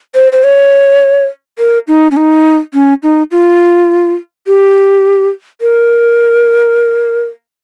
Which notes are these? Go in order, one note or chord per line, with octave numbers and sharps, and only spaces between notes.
C5
C5
C#5
A#4
D#4
C#4
D#4
C#4
D#4
F4
G4
A#4